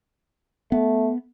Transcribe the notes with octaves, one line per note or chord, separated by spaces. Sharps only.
A3 B3